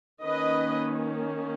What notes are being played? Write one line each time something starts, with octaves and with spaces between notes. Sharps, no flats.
D#3 A#3 C#4 B4 D#5